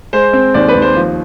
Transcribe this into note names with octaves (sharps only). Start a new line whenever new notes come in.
G#3 C5
C4
D#2 D5
B4
D#2
C5
F3